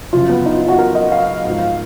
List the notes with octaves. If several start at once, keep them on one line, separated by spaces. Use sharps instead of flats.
F#2 C#3 F3 F4
B3
D#4
F4
F#4
A#4
D#5
F5
G#2 F3